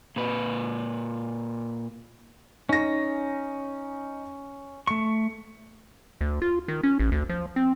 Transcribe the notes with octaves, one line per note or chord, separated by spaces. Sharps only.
A#2 B4
C#4 D#4 A#6
A3 C#6 C#7
D2
F4
D#3
C#4
A1
D2
F3
C4